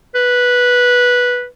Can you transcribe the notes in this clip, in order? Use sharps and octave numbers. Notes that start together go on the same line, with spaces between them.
B4